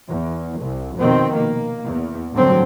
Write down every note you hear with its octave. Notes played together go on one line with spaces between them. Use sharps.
E2
C2
F1 B2 D#3 C4
A#3
E2
A1 G2 D3 F#3 C4